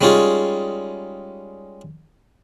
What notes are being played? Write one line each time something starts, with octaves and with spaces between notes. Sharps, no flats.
G3 G#3 C#4 D#4 F4 G#4